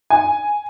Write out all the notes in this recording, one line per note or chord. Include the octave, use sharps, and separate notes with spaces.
G#5